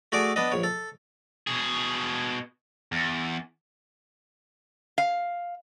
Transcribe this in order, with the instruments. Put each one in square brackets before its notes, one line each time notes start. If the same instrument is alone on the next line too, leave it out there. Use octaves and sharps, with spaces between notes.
[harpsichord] A3 F#4 G#4 A4 D5
B3 D4 D#5
A#1 C#5
A4
[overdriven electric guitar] B2 G#4
E2
[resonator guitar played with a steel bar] F5